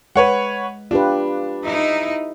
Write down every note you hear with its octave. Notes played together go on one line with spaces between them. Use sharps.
G#3 B4 C#5 F#5
D4 F4 G4 B4
D#4 E4